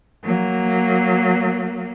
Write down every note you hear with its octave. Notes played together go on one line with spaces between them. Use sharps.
F#3 A#3